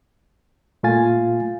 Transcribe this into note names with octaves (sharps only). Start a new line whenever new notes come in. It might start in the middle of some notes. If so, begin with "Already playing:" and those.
A#2 A3 F4 F5 G#5 A6